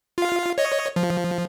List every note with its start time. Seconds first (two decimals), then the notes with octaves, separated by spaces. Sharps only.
0.18 F4 F5
0.58 C#5 D#5
0.96 F3